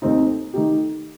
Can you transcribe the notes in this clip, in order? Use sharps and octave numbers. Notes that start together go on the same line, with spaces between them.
D#2 D#3 A3 C4 D#4
D#3 A3 D#4 G4